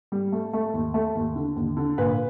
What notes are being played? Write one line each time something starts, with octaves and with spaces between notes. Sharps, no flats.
G3
A3
A3
D#2
A3
D#2
D3
D#2
D3
A#2 B4